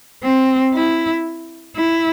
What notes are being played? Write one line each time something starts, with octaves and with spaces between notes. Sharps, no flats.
C4
E4
E4